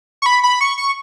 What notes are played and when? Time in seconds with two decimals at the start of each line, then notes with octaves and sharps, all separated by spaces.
0.22 C#6
0.26 B5
0.43 B5
0.61 C#6
0.78 C#6